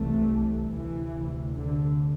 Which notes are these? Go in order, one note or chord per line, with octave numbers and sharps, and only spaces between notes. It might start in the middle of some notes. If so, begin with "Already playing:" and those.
Already playing: C2 C3 E3 A3
D2 C3 E3
D3